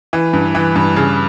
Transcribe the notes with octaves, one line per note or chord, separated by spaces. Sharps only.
E3
G2
E3
G2
C#3